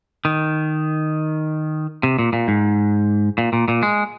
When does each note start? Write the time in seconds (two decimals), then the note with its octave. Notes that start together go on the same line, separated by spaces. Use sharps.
0.25 D#3
2.03 C3
2.19 A#2
2.33 A#2
2.48 G#2
3.38 A#2
3.53 A#2
3.68 A#2
3.83 G#3